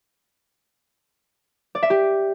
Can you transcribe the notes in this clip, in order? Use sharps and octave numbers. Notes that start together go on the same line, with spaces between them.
D5
E5
G4